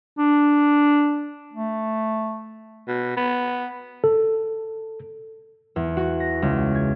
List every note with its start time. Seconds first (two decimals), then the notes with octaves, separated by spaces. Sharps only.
0.18 D4
1.53 A3
2.88 B2
3.17 B3
4.04 A4
5.76 E2
5.97 F#4
6.20 A#6
6.42 C#2
6.75 G#6